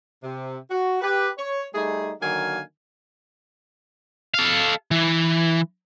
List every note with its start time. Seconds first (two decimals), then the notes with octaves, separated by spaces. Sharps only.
0.23 C3
0.71 F#4
1.02 G4 B4
1.38 C#5
1.73 G3 A3 D#4 G#4
2.21 D3 D#3 F#3 A#3 F5 G#5
4.34 A4 F5
4.91 E3